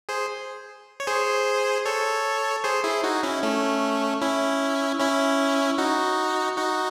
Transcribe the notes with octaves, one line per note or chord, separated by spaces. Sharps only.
G#4 C5
C#5
G#4 C5
A4 C#5
G#4 C5
E4 G#4
D#4 F#4
C#4 E4
A3 C#4
C#4 E4
C#4 E4
D#4 F#4
D#4 F#4